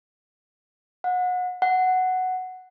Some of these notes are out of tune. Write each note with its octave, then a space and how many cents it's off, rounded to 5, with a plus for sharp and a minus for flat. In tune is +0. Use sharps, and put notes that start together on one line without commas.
F#5 -30
F#5 +0